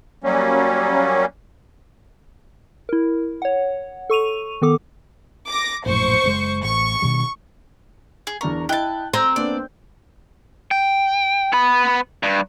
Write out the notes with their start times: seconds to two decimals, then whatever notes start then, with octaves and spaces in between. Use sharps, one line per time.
0.24 F#3 G3 A#3 C#4
2.89 E4 A#4
3.42 C#5 F#5
4.10 A4 C#6 D#7 F7
4.62 D#3 B3 A4 D6
5.48 D6 A#6
5.86 A#1 F#2 A2 C5 C#6
6.24 F#1 B2 G#3
6.63 A1 C#6
7.02 B2 D#3 G3
8.27 G#4
8.41 E2 D4 A#4 C#6
8.69 E4 D#5 G5 A5 F#6
9.14 C4 A#5 G6
9.36 A#3 B3 D4 D5
10.71 G5
11.53 B3 B5
12.23 G2